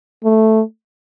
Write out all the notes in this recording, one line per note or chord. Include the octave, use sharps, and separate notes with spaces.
A3